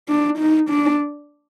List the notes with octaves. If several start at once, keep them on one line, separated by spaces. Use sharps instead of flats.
D4
D#4
D4